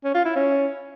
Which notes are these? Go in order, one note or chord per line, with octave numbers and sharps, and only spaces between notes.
C#4
F4
E4
C#4